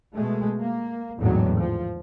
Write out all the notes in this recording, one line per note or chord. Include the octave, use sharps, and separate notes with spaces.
B2 G#3 A3
A#3
G#1 E2 A2 D3 D#3 F#3
F3